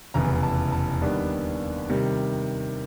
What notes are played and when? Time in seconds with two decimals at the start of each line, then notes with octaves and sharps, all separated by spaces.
0.14 F1 E2 C#3 E3 A#5
0.43 A5
0.72 A5
1.01 D#2 D#3 G3 B3 D4 B5
1.89 C3 D#3 G3